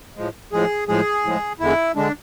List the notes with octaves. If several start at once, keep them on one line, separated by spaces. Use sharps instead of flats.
A2 F3 G#3
A2 F3 G#3 G#4
A2 F3 G#3 G#4
A2 F3 G#3
E2 D3 G#3 E4
D3 G#3 D4